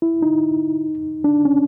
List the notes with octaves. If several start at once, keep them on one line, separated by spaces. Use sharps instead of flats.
E4
D#4
D4
C#4